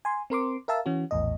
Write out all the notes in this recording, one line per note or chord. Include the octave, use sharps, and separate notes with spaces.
G#5 C6
C4 A#4 C6 D6
A#4 E5 F5 A5 E6
E3 C#4 F#4
A#1 E2 A2 D#5